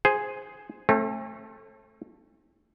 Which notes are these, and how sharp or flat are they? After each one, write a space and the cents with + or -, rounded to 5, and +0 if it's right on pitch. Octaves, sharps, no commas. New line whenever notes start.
G#4 +0 C5 +0
A3 +0 C4 +45